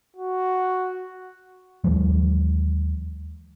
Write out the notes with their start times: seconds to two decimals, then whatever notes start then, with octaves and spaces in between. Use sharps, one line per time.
0.16 F#4
1.84 D#2 E3 F#3 G#3